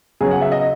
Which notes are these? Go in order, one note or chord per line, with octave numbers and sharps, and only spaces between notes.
C#3 F#3 B3 G#4
F#5
E5
D#5